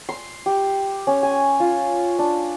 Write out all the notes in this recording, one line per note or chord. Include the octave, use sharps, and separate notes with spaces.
C6
G4
C#4
G#5
F4
D4